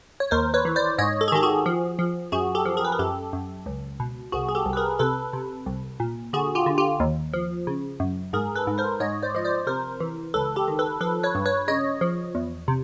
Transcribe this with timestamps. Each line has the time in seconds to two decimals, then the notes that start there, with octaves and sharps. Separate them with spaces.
0.20 C#5
0.31 D#2 A#4 C5
0.54 B4 C#5
0.65 E3
0.76 C5 D5
0.98 G#2 C#5 D#5
1.21 A4
1.28 G#4
1.32 D#3 G4 A4
1.43 F#4 G#4
1.66 F3
1.99 F3
2.32 F#2 F#4 G#4
2.55 G4 A4
2.65 F3
2.77 G#4 A#4
2.85 B4
2.92 A#4
2.99 F#2 G4 A4
3.33 F#2
3.66 C#2
4.00 B2
4.32 C2 F#4 G#4
4.49 G#4
4.55 G4 A4
4.66 C2
4.73 B4
4.77 G#4 A#4
4.99 C3 A4 B4
5.33 C3
5.66 C2
6.00 A#2
6.33 D3 F#4 G#4
6.55 F4 G4
6.66 D3
6.78 F4 G4
7.00 D#2
7.33 F3
7.67 C#3
8.00 F#2
8.33 G#2 G#4 A#4
8.55 A4 B4
8.67 G#2
8.78 A#4 C5
9.00 G#2 C#5 D#5
9.23 C5 D5
9.35 F3 D#5
9.45 C5 D5
9.67 C3 A#4 C5
10.00 E3
10.34 C#2 A4 B4
10.56 G4 A4
10.68 D#3
10.79 A4 B4
11.01 F3 A4 B4
11.23 B4 C#5
11.35 G2
11.46 B4 C#5
11.68 C#3 C#5 D#5
12.01 F3
12.35 E2
12.68 C3